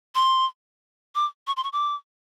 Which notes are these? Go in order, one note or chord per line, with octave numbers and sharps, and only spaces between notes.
C6
D6
C#6
C6
C#6
D6